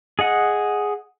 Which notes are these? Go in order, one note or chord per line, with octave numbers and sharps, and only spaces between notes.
G#4 D#5 F#5